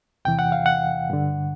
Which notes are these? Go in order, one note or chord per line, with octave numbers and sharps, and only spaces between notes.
E2 C3 E3 G5
F#5
F5
F#5
G2 D3